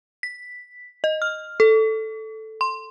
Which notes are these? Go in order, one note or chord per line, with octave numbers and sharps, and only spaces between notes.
B6
D#5
F6
A4
C6